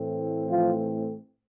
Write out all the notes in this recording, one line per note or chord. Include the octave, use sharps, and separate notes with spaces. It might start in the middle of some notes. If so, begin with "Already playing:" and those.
Already playing: A2 E3 A3 C4
F3 F4